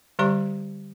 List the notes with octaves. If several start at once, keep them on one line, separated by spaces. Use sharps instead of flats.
D3 G3 G4 D5 A#5 C#6